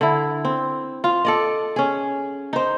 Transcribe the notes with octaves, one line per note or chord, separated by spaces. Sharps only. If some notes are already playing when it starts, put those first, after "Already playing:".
D3 E4
C4
F4 F5
A4 D5 D#5
C#4 G#4
D#4 C5